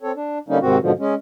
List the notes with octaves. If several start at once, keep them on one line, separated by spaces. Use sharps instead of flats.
C4 A4 C#5
D4
D3 G3 A#3 C#4 D#4
G#2 C3 D#3 C4 F#4
G#2 B2 D3 F3
G#3 C#4